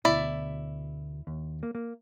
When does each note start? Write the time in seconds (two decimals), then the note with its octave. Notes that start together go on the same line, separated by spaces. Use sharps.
0.05 D2 B2 E4 D5
1.27 D#2
1.63 A#3
1.75 A#3